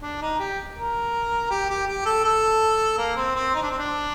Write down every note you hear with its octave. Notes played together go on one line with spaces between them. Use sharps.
D4
D#4
G4
A#4
G4
G4
G4
A4
A4
A#3
C4
C4
D#4
D4
C4
D4